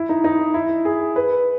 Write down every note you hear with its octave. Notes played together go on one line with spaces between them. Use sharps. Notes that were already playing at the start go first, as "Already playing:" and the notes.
Already playing: E4
D#4
D#4
E4
G#4
B4